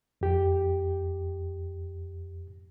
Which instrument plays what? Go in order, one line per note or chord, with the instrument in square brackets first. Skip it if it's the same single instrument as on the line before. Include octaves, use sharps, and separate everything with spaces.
[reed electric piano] F2 G4